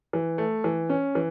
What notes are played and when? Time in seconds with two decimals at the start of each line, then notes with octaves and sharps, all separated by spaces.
0.13 E3
0.38 A3
0.64 E3
0.90 C#4
1.15 E3